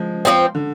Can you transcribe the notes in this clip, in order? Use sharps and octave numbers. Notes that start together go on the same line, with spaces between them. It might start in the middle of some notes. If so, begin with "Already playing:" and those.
Already playing: F3 G#3
F3 G#3 C4
D3